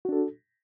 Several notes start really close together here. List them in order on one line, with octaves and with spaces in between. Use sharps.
F#4 D4 A4